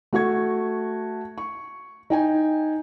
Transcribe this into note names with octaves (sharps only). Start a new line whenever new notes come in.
A3 F#4 C#6 G#6
C#6
D#4 G5 G#5